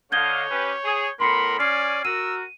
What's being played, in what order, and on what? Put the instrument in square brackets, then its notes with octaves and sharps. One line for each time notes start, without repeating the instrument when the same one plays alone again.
[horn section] D3 D#5 F5 [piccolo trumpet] C#5 [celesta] G6 G#6 G7
[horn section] C#4 G4 B4
G#4
[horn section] A2 B3 B5 [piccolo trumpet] A#4 [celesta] C6 C7 C#7
[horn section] C#4 G#5 [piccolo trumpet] D5 [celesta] F6 C7
[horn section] F#4 A#4 [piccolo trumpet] E6 [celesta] D#7